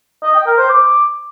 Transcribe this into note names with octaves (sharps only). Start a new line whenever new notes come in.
D#5
G5
A#4
C5
D6